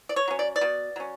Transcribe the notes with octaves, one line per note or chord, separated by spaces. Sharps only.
D5
C#5
F#3 C#4
D5
D5
B2
F#3 C#4